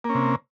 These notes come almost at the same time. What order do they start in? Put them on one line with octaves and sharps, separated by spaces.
A#3 C#4 C3